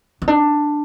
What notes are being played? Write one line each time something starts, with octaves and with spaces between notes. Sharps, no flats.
B3
D4